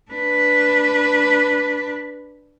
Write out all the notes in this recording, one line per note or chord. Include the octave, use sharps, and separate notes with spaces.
D4 B4